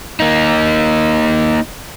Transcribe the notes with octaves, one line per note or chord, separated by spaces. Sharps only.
A#3 D#4